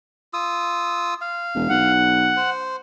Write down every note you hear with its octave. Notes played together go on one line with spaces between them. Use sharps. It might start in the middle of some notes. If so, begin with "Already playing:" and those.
F4 D#6 E6
F5
E1
B1 F#5
C5